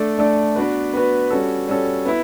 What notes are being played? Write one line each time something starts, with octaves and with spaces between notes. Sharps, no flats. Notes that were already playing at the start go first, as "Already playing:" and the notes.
Already playing: A3 D4 A4 D5
A3 D4 A4 D5
B3 D4 F#4 B4
B3 D4 F#4 B4
G3 C#4 F#4 A4
G3 C#4 F#4 A4
B3 E4